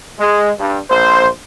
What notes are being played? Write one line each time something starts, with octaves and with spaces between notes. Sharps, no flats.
G#3
G2
A#1 C5